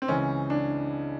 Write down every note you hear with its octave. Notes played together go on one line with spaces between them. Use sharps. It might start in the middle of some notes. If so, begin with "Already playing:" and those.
C4
C#2 C#3 E3 C#4
D4